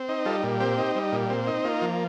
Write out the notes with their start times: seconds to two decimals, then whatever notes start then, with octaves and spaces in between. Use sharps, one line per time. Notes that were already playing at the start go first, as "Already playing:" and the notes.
Already playing: C4
0.09 D#4
0.26 G3 F4 A4
0.43 A#2
0.60 C4 G4
0.78 D#4
0.95 G3
1.12 A#2
1.30 C4
1.47 D#4
1.65 A#3 F4
1.82 F3